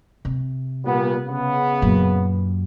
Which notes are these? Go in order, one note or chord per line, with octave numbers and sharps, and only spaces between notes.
C3
A#2 G3 B3
C#3 B3
F#2 A#2